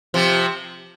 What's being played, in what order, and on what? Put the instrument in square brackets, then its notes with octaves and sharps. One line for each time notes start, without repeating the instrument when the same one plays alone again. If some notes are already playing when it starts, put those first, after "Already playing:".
[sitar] C3 F3